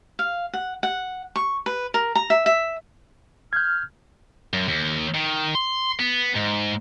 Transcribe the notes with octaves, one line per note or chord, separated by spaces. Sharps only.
F5
F#5
F#5
C#6
B4
A#4
A#5
E5
E5
F6 G6 G#6
F#2
D#2
D#3
C6
B3
G#2